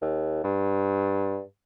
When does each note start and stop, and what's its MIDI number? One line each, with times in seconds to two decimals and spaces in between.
0.02 0.43 39
0.44 1.41 43